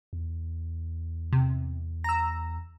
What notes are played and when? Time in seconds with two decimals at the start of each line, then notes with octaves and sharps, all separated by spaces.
0.13 E2
1.33 C3
2.04 A#5 E6